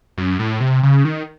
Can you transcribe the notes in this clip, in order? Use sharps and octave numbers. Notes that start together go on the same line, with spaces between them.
F#2
A2
C3
C#3
D#3